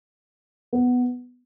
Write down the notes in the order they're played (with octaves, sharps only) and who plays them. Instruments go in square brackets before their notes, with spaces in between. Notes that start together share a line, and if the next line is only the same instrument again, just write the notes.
[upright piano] B3